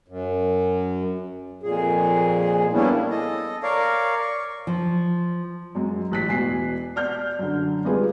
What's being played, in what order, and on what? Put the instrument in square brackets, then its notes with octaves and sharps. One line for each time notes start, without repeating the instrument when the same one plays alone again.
[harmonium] F#2
F2 A#2 G#4
G3 A#3 B3 C#4 D4 E4
[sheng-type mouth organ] A4 D#5
A#4 C#5 D5 F5
C#6
[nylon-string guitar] F3
[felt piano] F#2 G#3
A1 F#6 B6
E1 G#5 C7
D5 F6 G6
F#2 D3
G3 G#3 F4 G#4 B4